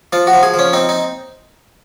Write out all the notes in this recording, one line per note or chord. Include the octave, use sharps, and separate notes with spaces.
F3 F4
F#4
F3
G#4
F3
C#4
C4 D#4
D#4